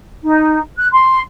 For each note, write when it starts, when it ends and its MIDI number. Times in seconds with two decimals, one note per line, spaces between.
0.23 0.58 63
0.77 0.86 90
0.91 1.19 84